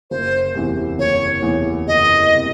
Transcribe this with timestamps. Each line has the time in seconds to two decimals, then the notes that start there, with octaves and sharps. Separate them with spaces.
0.11 F#1 C5
0.55 E2 C3
0.99 F#1 C#5
1.42 E2 C3
1.87 F#1 D#5
2.35 C3